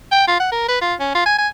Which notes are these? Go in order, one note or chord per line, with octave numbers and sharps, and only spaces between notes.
G5
F4
F#5
A#4
B4
F4
C#4
F4
G#5
G#5